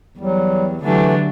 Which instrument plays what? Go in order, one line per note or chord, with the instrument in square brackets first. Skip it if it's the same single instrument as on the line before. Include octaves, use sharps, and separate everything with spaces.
[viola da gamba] E2 [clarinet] F#3 [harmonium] G3
[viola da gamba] D3 F#3 D4 [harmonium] E3 A3 [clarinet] G4